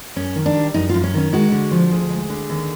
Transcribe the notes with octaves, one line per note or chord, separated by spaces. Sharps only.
F#2 C#4
D#3
D4
G3
F#2 D#4
F#2 F4
C#4
D#3 C#4
G#3 F#4
D3
F3
D2 G#4
G#3
D3
D#2